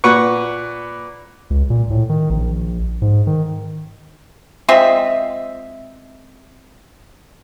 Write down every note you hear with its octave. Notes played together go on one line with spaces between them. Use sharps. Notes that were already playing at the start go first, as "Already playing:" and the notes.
A#2 B4 F#5 C#6
C#2
A#2
A2
D#3
A#1
G#2
D#3
G#3 C4 F4 E5